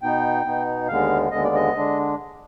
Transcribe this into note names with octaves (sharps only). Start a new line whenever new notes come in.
B2 B3 D#4 G5
B2 B3 D#4
D#2 D3 G#3 B3 F5
D#2 D3 G#3 B3 D#5
D5
D#5
D3 G#3 D4